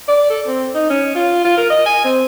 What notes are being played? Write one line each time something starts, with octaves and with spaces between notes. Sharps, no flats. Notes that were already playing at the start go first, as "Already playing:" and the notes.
D5
A4
C4
D#4
C#4
F4
F4
A#4
D#5
G#5
C4